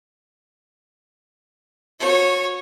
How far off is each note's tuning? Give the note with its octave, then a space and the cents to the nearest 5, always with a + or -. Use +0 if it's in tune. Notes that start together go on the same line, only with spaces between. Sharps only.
F#4 -35 C#5 -15